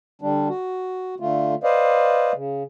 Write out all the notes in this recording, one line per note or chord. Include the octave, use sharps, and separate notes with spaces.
D3 G3 D4
F#4
D3 A3 F4
B4 C5 D5 D#5 F5
C#3